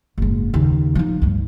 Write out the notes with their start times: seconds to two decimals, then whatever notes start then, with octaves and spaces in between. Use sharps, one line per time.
0.18 F#1 G#2
0.54 D#2 C#3
0.95 F3 D#4
1.22 D2 G2